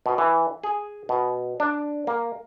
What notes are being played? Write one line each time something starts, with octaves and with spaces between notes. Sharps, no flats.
B2
E3
G#4
B2
D4
A#3